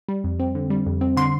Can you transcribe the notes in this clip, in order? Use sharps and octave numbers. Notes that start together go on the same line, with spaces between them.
G3
F2
C4
D3
G3
F2
C4
D3 C6